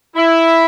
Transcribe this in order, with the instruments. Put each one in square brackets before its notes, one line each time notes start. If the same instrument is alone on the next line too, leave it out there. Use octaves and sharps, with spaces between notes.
[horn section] E4